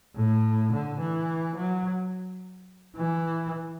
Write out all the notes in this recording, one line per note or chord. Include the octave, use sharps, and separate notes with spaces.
A2
D3
E3
F#3
E3